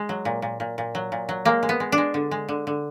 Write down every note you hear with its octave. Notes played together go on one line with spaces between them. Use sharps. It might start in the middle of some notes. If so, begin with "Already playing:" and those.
Already playing: G#3
F#3
A#2
A#2
A#2
A#2
F#3
A#2
F#3
G#3 A#3
G#3
B3
G#3
D4
G#3
D3
G#3
D3
D3